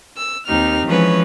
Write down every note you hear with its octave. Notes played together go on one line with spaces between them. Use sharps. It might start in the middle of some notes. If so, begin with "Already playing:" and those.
E6
D#2 C4 D#4 G4 F6
E3 F3 G#3 C#4 B4 C#5